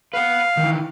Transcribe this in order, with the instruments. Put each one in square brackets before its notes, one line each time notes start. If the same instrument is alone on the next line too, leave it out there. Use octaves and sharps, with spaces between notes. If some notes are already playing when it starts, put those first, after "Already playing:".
[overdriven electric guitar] B4 F#5 [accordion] F5
[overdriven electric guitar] D#3 E3